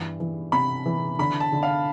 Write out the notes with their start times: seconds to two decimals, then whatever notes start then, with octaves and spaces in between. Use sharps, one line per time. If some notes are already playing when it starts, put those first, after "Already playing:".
Already playing: G2 E3
0.20 E3
0.52 C3 B5
0.86 E3
1.19 D3 B5
1.40 A5
1.52 D3
1.63 F5